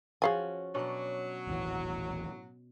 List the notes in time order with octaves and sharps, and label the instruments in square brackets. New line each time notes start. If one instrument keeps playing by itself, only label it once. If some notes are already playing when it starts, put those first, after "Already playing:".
[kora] F3 C#4 F#4 [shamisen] G#4 F5 G#5
[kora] B2 C#4 D4 [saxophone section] F#3
[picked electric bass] D#1 A1 E3